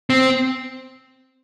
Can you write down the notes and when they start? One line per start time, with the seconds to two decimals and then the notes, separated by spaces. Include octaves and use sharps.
0.10 C4